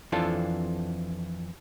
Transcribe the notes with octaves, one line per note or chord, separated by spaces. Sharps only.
F2 E3 C4 D4 F4 A4